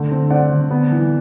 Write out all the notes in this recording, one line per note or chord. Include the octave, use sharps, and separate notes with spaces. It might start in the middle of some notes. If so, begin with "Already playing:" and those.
Already playing: D3 A3
C4
C4 D5 F#5
D3
B3
E3